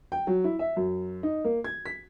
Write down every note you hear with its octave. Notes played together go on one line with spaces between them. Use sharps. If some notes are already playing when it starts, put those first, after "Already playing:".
G5
F#3
E4
E5
F#2
D#4
A#3
G#6
B6